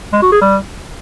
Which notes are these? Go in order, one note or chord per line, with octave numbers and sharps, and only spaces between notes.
G#3
F#4
G#4
G3